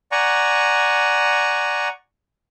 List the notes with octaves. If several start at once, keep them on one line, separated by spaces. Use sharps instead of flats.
D5 F#5 G#5 A#5 C#6